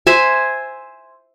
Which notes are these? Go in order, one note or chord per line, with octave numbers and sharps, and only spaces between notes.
C5 E5 G#5